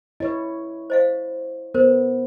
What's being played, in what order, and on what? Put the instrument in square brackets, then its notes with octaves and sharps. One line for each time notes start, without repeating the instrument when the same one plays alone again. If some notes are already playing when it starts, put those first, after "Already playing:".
[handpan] E4 C#5 [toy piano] B4 D#5
[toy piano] C5 D#5 F5
[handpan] B3 [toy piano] A#4 C5